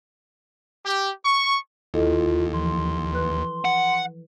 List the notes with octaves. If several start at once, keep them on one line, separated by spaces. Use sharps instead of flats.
G4
C#6
D#2 E4 F4 A4 D#5
E3 F3 C6
B4 F#6
F#5